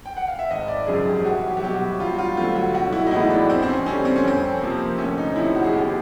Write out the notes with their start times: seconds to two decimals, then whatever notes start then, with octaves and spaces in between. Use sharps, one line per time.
0.06 G5
0.17 F#5
0.28 F5
0.39 E5
0.51 G#1 D#5
0.68 D5
0.87 F#2 C#3 F3 G#4
1.07 G4
1.24 C2 F#4
1.50 G4
1.57 F#4
1.62 B2 F#3 G4
1.75 F#4
2.00 G2 F4
2.12 F#4
2.19 F4
2.36 D3 F#3 A3 C4 F4
2.56 F#4
2.74 B1 F#4
2.92 E4
3.07 D#4
3.11 A2 E3 G#3 B3 E4
3.30 D4
3.49 F2 C4
3.63 C4
3.68 C#4
3.86 D3 G3 C4 C#4
4.05 C4
4.16 C#4
4.24 F2 C4
4.61 C3 F3 A#3
4.98 D2 C#4
5.18 D#4
5.36 C3 F3 E4
5.55 F#4
5.64 G#4
5.73 D#2 G4